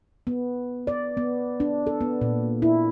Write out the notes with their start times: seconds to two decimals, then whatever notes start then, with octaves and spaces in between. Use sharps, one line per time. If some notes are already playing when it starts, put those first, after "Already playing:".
0.27 B3
0.87 D5
1.17 B3
1.60 D4
1.87 A4
2.01 B3
2.21 A#2
2.62 E4